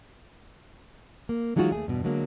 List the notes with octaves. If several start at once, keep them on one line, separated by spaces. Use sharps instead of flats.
A#3
E3 F#3 G#3 D#4 F4 F#4
D#2 A3 G#4
E2 G2 B2
D3 F#3 G#3 A#3